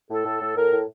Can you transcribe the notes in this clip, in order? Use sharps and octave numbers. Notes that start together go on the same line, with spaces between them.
A2 A4
A2
A2
A2 A#4
A2